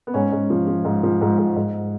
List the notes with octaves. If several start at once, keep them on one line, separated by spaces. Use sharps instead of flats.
B3
G#2 C#4
G#2
F3
F3
G#2
F3
G#2
G#2
G#2